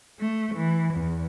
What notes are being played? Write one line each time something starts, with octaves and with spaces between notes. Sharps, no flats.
A3
E3
E2